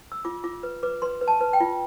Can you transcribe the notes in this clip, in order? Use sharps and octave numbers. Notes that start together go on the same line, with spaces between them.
E6
F4 D6
F4 D6
B4
B4 D6
B4 C6
B4
A5
B4
G5
F4